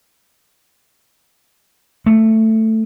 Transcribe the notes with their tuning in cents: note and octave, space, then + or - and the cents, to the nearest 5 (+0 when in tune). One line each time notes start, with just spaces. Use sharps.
A3 +5